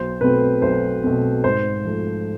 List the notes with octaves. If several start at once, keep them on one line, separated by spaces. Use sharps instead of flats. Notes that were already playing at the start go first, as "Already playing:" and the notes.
Already playing: B1 C5
B2 A3 C4 B4
B1 C5
B2 A3 C4
G#2 C5
F3 A3